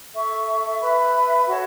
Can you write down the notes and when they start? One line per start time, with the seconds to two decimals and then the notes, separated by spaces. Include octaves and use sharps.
0.13 A4 E5 C#6
0.81 B4 E5 B5
1.48 F#4 A4 C#5 A5